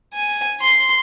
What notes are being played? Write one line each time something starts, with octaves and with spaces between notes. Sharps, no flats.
G#5
C6